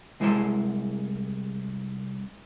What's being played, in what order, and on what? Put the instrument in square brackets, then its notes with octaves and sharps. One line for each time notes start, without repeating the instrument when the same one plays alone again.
[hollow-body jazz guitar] C2 G#3 E4 C#5 A5 C6